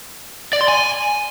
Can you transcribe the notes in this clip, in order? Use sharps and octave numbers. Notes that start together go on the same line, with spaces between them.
D5
C6
G#5